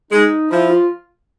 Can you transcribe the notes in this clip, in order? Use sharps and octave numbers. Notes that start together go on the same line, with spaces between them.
G#3 D#4
F3 E4
F4